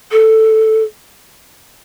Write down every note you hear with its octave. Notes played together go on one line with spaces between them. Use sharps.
A4